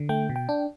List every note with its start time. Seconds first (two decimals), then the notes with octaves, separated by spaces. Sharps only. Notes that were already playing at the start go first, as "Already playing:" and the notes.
Already playing: D3
0.09 A3 G5
0.29 B2
0.36 G5
0.49 D4